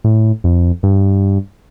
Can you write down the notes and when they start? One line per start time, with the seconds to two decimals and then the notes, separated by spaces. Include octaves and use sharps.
0.04 A2
0.44 F2
0.83 G2